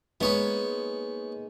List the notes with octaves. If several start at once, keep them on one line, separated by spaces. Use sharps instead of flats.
G#3 A#3 B3 D#4 C#5 B5